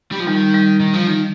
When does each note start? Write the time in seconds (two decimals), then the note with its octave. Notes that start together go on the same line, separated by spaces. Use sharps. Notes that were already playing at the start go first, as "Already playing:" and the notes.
0.12 G3
0.20 F3
0.27 D#3 G3
0.54 G3
0.80 D#3
0.94 F3
1.07 D#3